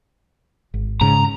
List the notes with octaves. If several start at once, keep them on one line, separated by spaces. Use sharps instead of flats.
G#1
G#2 C#3 A#5